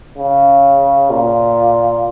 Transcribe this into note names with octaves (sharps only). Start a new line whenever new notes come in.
C#3
A#2